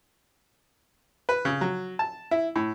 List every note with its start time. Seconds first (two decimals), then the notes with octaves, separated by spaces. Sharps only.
1.29 B4
1.45 C#3
1.61 F#3
1.99 A5
2.31 E4
2.56 A2